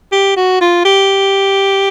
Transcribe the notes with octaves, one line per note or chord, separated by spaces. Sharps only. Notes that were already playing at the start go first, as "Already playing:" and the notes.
G4
F#4
F4
G4